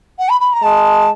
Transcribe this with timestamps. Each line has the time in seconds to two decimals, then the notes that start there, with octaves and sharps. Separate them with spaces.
0.18 F#5
0.29 B5
0.40 B5
0.52 A#5
0.62 G#3 A5